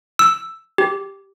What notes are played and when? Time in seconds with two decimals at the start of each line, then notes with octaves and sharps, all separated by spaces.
0.19 E6
0.78 G4